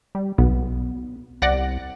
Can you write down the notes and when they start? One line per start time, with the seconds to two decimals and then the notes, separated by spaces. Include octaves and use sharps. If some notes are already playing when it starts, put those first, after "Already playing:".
0.15 G3
0.38 B1 B3
1.42 C2 D5 F#5 A#6